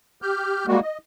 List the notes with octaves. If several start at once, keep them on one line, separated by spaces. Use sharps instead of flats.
G4 F6 G6
G3 G#3 A#3 F#4
D#5